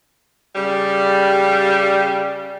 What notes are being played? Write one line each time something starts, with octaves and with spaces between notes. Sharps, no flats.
C#3 G3